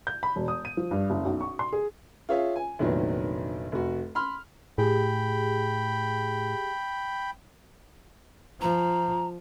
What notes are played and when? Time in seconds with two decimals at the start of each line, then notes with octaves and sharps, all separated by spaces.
0.07 G6
0.23 B5
0.36 E1
0.48 D#6
0.65 D#7
0.77 F3
0.91 G2
1.10 F#1
1.25 B1
1.41 C#6
1.59 C6
1.73 G#4
2.29 F4 G#4 C#5 E5 F5
2.56 G#5
2.79 F1 A#1 D#3 F#3 B3
3.72 F1 F#4
4.15 B5 C6 F6
4.78 A2 G4 G#4 G5 B5
8.61 F3 A#5